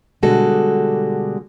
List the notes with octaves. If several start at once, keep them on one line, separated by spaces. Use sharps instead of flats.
B2 D3 G3 G#3 F#4 A4